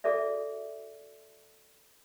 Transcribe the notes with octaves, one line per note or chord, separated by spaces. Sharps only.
F#4 G#4 A4 D5 E5